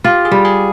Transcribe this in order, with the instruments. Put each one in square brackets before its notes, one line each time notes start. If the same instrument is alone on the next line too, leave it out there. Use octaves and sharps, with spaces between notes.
[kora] F4 [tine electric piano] G4
[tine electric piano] G#4
[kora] G3
[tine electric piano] G#4